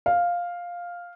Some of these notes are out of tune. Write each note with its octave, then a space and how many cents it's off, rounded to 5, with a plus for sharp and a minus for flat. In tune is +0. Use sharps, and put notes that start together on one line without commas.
F5 +5